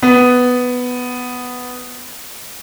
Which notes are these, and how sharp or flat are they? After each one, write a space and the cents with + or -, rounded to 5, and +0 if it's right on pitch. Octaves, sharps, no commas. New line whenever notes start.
B3 +5